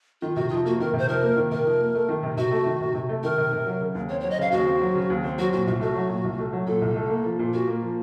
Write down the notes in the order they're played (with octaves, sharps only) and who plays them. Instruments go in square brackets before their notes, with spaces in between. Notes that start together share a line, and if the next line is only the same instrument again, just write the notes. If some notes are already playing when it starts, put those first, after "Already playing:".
[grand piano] D#3 [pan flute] F4
[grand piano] C3 [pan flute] F#4
[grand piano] F2 [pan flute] F4
[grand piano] A#3 [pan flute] F#4
[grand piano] D#3 [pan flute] A#4
[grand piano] C3
[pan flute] C5
[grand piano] F2 [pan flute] A#4
[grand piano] A#3
D#3
[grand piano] C3 [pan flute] A#4
[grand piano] F2
A#3
A3
D#3
C3
[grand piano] C3 [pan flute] F#4
[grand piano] A3
D#3
C3
C3
A3
[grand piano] D#3 [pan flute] A#4
[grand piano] C3
C3
F#3
C#3
D#2
[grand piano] C4 [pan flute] C#5
[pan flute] C#5
[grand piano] F#3
[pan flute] D#5
[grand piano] C#3 [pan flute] F5
[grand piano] D#2 [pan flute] F#4
[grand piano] C4
F#3
C#3
D#2
C4
[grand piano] F#3 [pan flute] F#4
[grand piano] A#2 [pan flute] F#4
[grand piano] C2 [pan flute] F#4
[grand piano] A3 [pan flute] F#4
[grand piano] F#3
A#2
C2
A3
F#3
[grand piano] A#2 [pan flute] A4
[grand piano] C2
A3
A#3
F3
A#2
[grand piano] A#2 [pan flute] F#4
[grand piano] A#3
F3